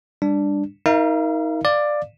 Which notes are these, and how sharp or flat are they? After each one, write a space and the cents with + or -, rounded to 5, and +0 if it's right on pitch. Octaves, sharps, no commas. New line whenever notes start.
G3 +30 D4 +0
D#4 +30 A#4 +0 F5 -35
D5 +10 F5 +0